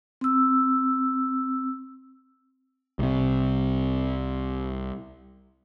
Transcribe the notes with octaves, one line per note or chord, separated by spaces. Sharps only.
C4 E6
C2 C3